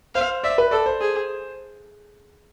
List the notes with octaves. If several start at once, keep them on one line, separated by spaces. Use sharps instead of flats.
C5 F5
D5 E5
B4
A4 D5
C5
G#4